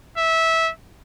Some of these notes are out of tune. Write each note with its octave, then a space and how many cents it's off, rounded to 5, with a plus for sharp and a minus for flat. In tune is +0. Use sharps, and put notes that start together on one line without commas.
E5 -15